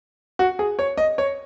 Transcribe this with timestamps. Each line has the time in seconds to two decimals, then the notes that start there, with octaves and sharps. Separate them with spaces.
0.39 F#4
0.59 G#4
0.79 C#5
0.98 D#5
1.18 C#5